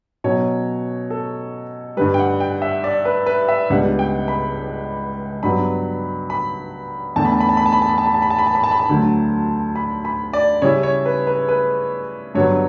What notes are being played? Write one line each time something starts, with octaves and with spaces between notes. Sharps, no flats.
B2 F#3 C#4 C#5
A4
G2 D3 G3 B4
G5
F#5
G5
E5
D5
B4
B4
E5
C#2 C#3 G3 B3 D4 F#5
G5
B5
G2 F#3 B3 B5
B5
E2 D3 A3 A5
B5
A5
B5
A5
B5
A5
B5
A5
B5
A5
B5
A5
B5
A5
B5
A5
B5
A5
B5
A5
D2 D3 F#3 A3
B5
B5
D5
C#3 G3 C#4 E4 C#5
C#5
B4
B4
B4
G2 D3 F#3 B3 C#5